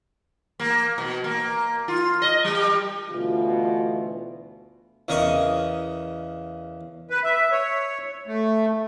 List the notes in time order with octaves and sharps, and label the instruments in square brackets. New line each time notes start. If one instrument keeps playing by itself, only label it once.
[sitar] A#3
B2
A#3
F4
D#5
G3
[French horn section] D2 B2 E3 F4
[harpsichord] E2 C#3 A#4 D#5 C#6 D#6
[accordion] B4
E5
C#5
A3